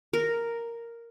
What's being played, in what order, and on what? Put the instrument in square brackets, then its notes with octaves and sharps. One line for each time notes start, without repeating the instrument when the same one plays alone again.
[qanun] A#4